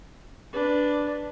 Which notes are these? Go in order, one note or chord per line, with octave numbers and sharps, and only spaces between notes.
D4 B4